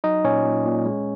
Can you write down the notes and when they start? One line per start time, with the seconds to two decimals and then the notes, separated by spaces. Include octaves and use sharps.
0.04 F#3 D#4 D#5
0.24 A#2 C#4 C#5
0.45 A#2
0.65 A#2
0.85 G#3